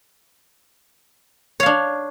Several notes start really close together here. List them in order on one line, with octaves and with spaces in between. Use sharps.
C#5 F5 D4